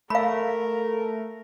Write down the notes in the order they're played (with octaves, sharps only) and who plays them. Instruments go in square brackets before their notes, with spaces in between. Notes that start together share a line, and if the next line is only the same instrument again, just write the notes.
[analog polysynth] A3 [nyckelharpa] A#4 [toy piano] F5 B5